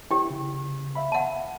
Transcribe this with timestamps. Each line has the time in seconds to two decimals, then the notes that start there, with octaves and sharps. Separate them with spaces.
0.11 E4 G4 G5
0.30 C#3
0.95 E5 F5 B5
1.12 F#5 A5